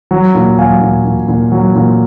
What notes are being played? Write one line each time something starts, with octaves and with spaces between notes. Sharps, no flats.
F#3
A#2
F#3 F5 G#5
A#2
A#2
A#2
F#3
A#2